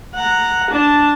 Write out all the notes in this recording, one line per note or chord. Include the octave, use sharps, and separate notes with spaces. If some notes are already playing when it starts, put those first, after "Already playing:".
F#5 A#5
D4 A5